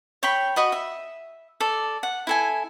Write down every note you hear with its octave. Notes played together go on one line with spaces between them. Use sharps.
C#5 G5 B5
F#4 D#5 B5
E5
A4 D5
F#5
E4 A4 G#5